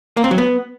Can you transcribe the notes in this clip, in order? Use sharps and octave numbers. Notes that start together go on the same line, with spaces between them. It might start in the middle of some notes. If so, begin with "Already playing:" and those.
A#3
C4
F#3
B3